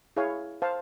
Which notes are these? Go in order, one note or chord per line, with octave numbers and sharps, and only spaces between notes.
E4 G#4 C#5 F5 G#5
C5 F5 A5